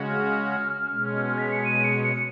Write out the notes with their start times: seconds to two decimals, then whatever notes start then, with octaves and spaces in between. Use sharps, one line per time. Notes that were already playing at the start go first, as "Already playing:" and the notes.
Already playing: C#3 G#3 C#4 F#4
0.08 F6
0.87 B2 G#3 C#4
1.38 B6
1.51 C#7
1.65 D#7
1.84 C#7
2.03 C#7